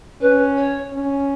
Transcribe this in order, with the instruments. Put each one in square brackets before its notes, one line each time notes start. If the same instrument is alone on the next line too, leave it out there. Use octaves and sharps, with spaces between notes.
[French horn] C#4 [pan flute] B4
[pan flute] C#5
[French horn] C#4